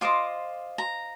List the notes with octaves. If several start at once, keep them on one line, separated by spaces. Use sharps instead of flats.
F4 C5 D#5 D6
A#5